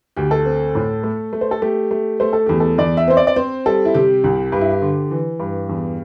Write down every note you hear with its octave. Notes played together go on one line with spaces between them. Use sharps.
D2 G4
A4
C4
A2
A3
A3
C5
A4
A3 G4
A3
A3 C5
A4
E2 G4
A4
E2 D5
E5
C4 C5
D5
D5
C4 C5
G3 A4
E4
C3 G4
C2
G2 G4
E4
G4
D3
E3
G2
E2